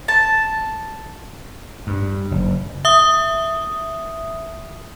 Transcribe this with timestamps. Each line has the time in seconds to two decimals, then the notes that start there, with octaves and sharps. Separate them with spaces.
0.08 A5
1.87 G2
2.31 F#1
2.85 E5 D#6